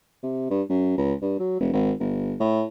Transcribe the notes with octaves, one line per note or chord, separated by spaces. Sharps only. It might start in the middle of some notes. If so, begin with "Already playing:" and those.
C3
G2
F#2
C#2
G2
F#3
F1
G#1
G1
A2